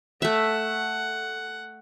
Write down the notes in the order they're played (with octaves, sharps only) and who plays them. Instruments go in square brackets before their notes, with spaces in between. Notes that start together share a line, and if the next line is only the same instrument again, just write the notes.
[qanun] A3 E5 [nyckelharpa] F#5